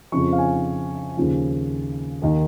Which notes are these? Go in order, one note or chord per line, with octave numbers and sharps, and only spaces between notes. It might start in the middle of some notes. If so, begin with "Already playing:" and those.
F2 C#3 F3 C#6
F5
G#5
D#2 C#3 F3
D#2 D#3